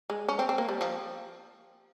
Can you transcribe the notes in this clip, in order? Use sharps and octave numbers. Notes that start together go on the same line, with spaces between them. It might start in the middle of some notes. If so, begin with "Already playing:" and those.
G#3
C#4
C4
C4
A#3
G3
F3